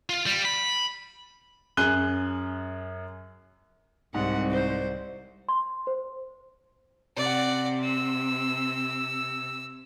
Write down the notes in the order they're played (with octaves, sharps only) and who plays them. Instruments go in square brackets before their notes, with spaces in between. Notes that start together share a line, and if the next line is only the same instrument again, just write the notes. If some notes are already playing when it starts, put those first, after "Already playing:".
[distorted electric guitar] F4
G3
B5
[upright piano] F#2 C#4 G#4 F#6 D#7 G7
[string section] C2 [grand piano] G#2 [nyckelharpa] F#5
[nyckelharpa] C5
[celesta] C6
C5
[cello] C3 [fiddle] D5 F#5
[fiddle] E6